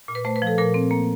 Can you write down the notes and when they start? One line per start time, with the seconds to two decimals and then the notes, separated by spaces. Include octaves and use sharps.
0.08 A#2
0.15 B4
0.25 A3 C5
0.36 B4
0.42 F3
0.47 A4
0.58 A#2 A#4
0.74 C4
0.91 A#3